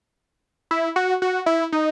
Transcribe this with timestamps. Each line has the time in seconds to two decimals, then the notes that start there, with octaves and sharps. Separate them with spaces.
0.71 E4
0.96 F#4
1.22 F#4
1.46 E4
1.72 D#4